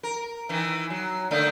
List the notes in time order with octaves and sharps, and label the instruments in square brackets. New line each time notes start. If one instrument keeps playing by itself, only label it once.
[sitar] A#4
D#3 E3
F#3
D3 A3 A#3